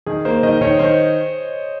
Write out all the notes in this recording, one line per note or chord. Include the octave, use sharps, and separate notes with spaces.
D#3 G#4
A#3 C5
D#3 D#5
D#3 C#5
D#3 C5